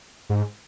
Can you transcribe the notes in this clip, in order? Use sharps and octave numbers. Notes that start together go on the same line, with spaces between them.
G#2